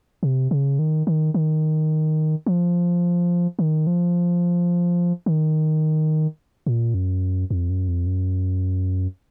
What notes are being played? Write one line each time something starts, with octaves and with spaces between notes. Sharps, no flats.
C3
C#3
D#3
D#3
D#3
F3
D#3
F3
D#3
A#2
F#2
F2
F#2
F2
F#2